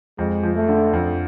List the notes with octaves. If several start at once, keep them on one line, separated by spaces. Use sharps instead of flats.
F2 G#3
F3
A3
D3
F2